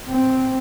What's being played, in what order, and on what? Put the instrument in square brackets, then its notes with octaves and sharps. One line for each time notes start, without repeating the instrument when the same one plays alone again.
[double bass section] C4